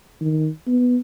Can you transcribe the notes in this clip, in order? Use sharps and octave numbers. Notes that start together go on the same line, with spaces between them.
D#3
B3